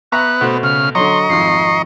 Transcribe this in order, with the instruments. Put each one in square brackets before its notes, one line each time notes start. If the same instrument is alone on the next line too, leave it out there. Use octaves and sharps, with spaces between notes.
[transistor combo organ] B3 [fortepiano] E5 A#5 C#6 [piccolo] F#6
[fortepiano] B2 A3 C5
[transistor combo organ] C#3 [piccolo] F6
[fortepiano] D3 F#3 [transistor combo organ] D#5 A#5 C#6 [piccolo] C6
[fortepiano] G#1 F2 [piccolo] C7